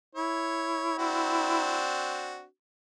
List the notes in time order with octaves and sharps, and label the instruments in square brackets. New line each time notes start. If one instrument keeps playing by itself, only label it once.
[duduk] E4 [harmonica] C#5
[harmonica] C4 D4 F#4